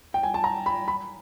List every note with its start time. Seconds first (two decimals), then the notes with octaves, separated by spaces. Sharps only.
0.14 G5
0.23 G#5
0.34 A5
0.44 A#5
0.66 B5
0.88 B5